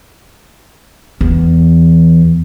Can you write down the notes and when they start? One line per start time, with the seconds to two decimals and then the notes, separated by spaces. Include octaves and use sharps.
1.21 E2